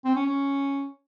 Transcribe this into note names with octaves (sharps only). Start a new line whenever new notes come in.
C4
C#4
C#4